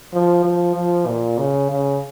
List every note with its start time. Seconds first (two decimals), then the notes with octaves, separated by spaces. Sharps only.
0.13 F3
0.45 F3
0.76 F3
1.07 A#2
1.38 C#3
1.71 C#3